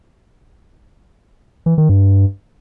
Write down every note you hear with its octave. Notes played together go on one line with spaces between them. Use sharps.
E3
D#3
G2